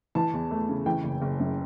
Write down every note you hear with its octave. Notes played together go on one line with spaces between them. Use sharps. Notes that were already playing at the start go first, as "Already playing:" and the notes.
E3 A5
E2
A3
C#3
E3 G5
F#1
F#1
F#2